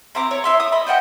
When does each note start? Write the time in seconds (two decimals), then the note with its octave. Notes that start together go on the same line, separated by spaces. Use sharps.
0.15 C4 E4 A#5 D6
0.31 C#5
0.44 E4 E5 C6
0.60 D#6
0.72 D#5 B5
0.87 C5 D#5 F#5 G5